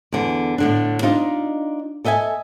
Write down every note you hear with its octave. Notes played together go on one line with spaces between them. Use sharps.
E2 D3
A2 D3 D4
D4 D#4 F4 D#5
A4 D#5 E5 G5 G#5